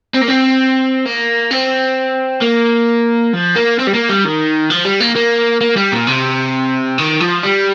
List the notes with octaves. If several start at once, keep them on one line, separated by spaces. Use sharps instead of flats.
C4
A#3
C4
A#3
C4
A#3
F3
A#3
C4
G3
A#3
G3
D#3
F3
G3
A#3
A#3
A#3
G3
A#2
C3
D#3
F3
G3